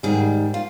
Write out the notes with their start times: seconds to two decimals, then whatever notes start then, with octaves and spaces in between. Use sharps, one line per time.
0.03 G#2 D#3 G3 G#4
0.54 F4